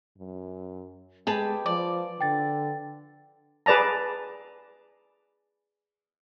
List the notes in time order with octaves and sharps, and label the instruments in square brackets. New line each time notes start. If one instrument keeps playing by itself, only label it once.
[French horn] F#2
[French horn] G#3 [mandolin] G4 [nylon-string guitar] G#4 B4 A5
[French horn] F3 [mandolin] D5
[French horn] D3 [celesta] G5 A6
[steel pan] G#4 B4 D5 A5 A#5